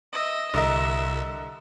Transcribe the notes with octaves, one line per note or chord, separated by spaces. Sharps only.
D#5 E5
C2 D3 A#4 D#5 E5